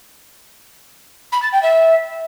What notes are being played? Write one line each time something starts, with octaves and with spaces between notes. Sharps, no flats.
B5
A6
G5
E5